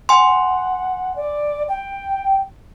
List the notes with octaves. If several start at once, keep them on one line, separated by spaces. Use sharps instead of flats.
F#5 G#5 C6
D5
G5